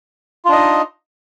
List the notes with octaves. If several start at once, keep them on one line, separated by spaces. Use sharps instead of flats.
D4 D#4 F4 D#5